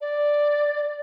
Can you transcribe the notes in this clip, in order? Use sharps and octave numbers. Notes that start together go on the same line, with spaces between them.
D5